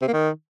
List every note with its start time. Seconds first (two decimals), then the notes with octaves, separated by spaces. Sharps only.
0.02 C3
0.08 A#3
0.13 D#3